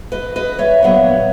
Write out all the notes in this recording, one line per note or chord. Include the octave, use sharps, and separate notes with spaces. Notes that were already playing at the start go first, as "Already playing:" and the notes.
B4 D#5
B4 D#5
C#5 E5
A#2 F#3 B3